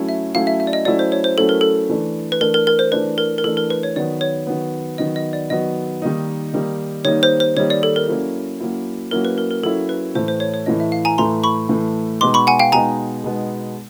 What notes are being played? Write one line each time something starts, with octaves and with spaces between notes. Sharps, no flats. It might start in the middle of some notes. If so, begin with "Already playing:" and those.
Already playing: F#3 A3 C#4 E4
E5
F#3 A3 C#4 E4 F5
E5
E5
D5
D#5
F#3 A3 C#4 E4 D5
C5
C#5
C5
F#3 A3 C#4 E4 A4
A#4
A4
E3 A3 D4
B4
E3 A3 D4 A#4
A#4
A#4
C5
E3 A3 D4 B4
A#4
A#4
E3 A3 D4 A4
A#4
B4
C#5
D#3 F#3 B3 D5
C#5
D#3 F#3 B3
D#3 F#3 B3 D#5
D#5
D5
D#3 F#3 B3 D#5
D#3 G3 A#3 D#4
D#3 G3 A#3 D#4
D#3 G3 A#3 D#4 C#5
C5
C5
D#3 G3 A#3 D#4 C#5
D5
A4
A#4
F#3 A#3 C#4 E4
F#3 A#3 C#4 E4
F#3 A#3 C#4 E4 A#4
B4
A#4
A#4
F#3 A#3 C#4 E4 A4
B4
A2 E3 A3 C5
C5
C#5
C#5
A2 E3 A3 D#5
E5
F5
G#5 A#5
A2 E3 A3 A#5 C6
B5 C#6
A2 E3 A3
B2 G#3 B3 D#4 C6 D6
B5 C#6
F#5 G#5
F5 G5
B2 G#3 B3 D#4 G#5 A#5
B2 G#3 B3 D#4